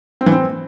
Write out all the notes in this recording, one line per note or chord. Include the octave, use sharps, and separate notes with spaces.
C4
E3
C4